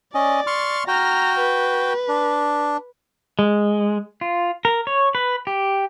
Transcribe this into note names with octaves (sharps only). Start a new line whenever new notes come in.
C#4 D5 D#5
C6 C#6 F6
F#4 G5 A#5 F6
B4
D4
G#3
F4
A#4
C#5
B4
G4